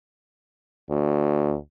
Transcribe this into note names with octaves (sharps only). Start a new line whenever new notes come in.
D2